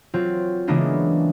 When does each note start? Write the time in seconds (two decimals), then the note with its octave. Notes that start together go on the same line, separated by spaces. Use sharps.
0.14 F#3 C4 F4
0.67 C#3 E3 G#3 A#3 B3 D4